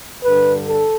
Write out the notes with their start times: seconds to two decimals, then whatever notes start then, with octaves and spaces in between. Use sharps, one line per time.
0.24 G2 D3 B4
0.68 A4